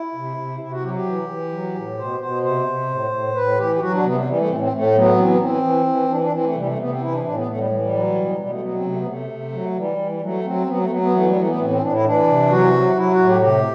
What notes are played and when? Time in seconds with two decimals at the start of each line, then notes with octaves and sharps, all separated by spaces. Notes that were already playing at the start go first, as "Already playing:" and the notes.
Already playing: E4
0.15 C3
0.37 C3
0.60 C3 E4
0.71 F#4
0.83 F#3 G4
0.94 G4
1.06 E3
1.29 E3
1.52 F#3
1.75 A2
1.97 B2 C5
2.20 B2 C5
2.43 C3 C5
2.66 C3
2.89 A2
3.11 A2
3.34 A2 B4
3.58 E3 G4
3.76 G4
3.80 F#3 F#4
3.93 D4
4.03 C3 B3
4.15 G3
4.26 E3 G3
4.37 A3
4.49 A2 C4
4.60 C4
4.72 A2 A3
4.95 F#3 B3
5.18 E3 C4
5.28 B3
5.38 E3 C4
5.63 E3
5.86 E3
6.09 E3 D4
6.21 D4
6.33 E3 C4
6.44 A3
6.55 C3 G3
6.66 A3
6.78 C3 B3
6.90 C4
7.01 E3 E4
7.12 D4
7.23 A2 D4
7.35 B3
7.47 A2 A3
7.58 G3
7.70 E3 G3
7.81 G3
7.93 F#3
8.15 B2
8.38 B2 G3
8.49 A3
8.61 F#3 B3
8.73 C4
8.83 C3 A3
8.96 B3
9.07 C3 A3
9.30 C3
9.52 F#3
9.69 A3
9.75 E3 G3
9.98 E3
10.11 G3
10.22 F#3 A3
10.45 F#3 C4
10.66 F#3 B3
10.79 A3
10.89 F#3 B3
11.01 B3
11.13 E3 A3
11.25 G3
11.36 E3 A3
11.47 B3
11.59 A2 C4
11.70 C4
11.81 A2 D4
11.92 E4
12.04 E3 D4
12.27 C3
12.50 F#3 F#4
12.73 F#3
12.96 F#3 E4
13.11 F#4
13.19 A2
13.27 G4
13.41 C3 G4